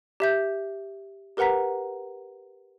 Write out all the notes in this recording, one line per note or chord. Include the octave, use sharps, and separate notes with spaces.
G4 E5 G6
G4 A#4 B4 F#5 A#5 B6